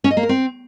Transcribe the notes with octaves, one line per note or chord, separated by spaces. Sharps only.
C#4
D#5
A#3
A#4
C4